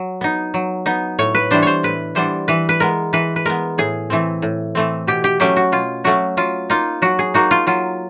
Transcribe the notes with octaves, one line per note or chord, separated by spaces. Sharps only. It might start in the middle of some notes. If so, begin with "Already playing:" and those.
Already playing: F#3
B3 D#4
F#3
B3 D#4
A2 C#5
B4
E3 G3 B3 D4 C5
C5 C#5
A2 B4
E3 G3 B3 D4 C5
E3 B4
B4
G#3 B3 A#4
E3 B4
B4
G#3 B3 A#4
A2 G#4
E3 A3 C4
A2
E3 A3 C4
B2 G4
G4
F#3 A3 C#4 G4
F#4
B2 F4
F#3 A3 C#4 F#4
F#3 F4
A#3 D#4 F4
F#3 F#4
G#4
A#3 D#4 F#4
F4
F#3 F4